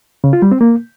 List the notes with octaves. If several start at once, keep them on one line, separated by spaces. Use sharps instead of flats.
C#3
F4
G3
C4
A#3